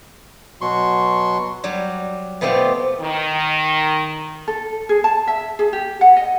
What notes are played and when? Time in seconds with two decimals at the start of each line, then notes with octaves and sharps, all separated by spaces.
0.61 B2 F#3 C6 C#6
1.64 F#3 G3
2.41 B2 A3 B3 C4 F4 G4
3.00 D#3
4.48 A4
4.89 G#4
5.04 A5
5.27 E5
5.59 G#4
5.73 G4
6.01 F#5
6.17 D#5